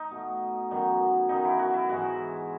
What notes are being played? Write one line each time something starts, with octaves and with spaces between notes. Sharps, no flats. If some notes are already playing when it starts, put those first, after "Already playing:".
Already playing: D#4
B2 A3
F#2 D#3 F#3 B3
F#2 D#3 F#3 B3 D#4
E4
F#4
E4
G#2 E3 G#3 F#4